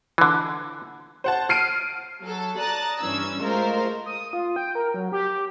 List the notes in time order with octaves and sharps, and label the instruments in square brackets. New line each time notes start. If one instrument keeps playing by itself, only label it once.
[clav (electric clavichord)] D3 E3
[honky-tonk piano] C5 F#5 A5
F6 C7 D7 D#7
[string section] F#3 A4
D5 A5 A#5 D#6 F#6 A6
G2 E3 C#4 E6 G#6
G#3 A3 F4 A#4 C5
[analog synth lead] D#6
F4
G5
A#4
F#3
G4